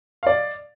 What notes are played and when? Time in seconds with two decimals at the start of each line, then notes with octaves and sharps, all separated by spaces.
0.23 F5
0.27 D5
0.30 D#5